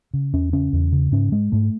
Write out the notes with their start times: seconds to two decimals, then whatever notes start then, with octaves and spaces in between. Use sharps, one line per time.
0.14 C#3
0.33 E2 C#4
0.53 C#3 C#4
0.73 E2
0.92 C#3
1.12 G#2 C#4
1.32 G#2 G#3
1.52 G#2 A3